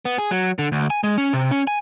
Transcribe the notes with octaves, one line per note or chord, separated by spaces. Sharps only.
B3
G#4
F#3
D3
D2
G#5
G#3
C#4
C3
C#4
G#5